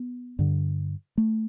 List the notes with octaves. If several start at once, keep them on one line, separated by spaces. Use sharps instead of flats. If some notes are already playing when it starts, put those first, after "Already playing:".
Already playing: B3
G2 D3
A3